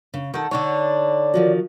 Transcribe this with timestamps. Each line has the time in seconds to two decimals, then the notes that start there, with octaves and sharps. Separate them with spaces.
0.14 C#3
0.34 D#3 A4 F#5
0.51 D3 D4 D#4 C#5
1.34 D#3 F3 F#4